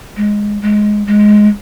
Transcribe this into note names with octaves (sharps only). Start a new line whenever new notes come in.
G#3
G#3
G#3